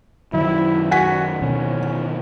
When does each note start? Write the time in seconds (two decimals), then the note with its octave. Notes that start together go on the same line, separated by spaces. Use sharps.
0.33 F#2 D#3 F#3 E4
0.91 F#4 F#5 G#5 B6
1.42 B2 D#3 E3 C#4